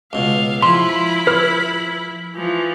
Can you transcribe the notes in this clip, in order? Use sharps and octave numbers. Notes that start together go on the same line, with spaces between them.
C#2 B2 F5
F3 E4 B5 C6
B4 F6
E3 F3